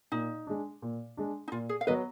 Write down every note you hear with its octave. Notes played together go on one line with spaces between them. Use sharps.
A#2 D#4
G#3 D4
A#2
G#3 D4
D#4
A#2 F4
G#4
F5
F#3 B3 B4 D#5